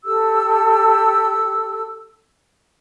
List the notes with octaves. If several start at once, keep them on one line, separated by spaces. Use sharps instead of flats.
G4 A4 E6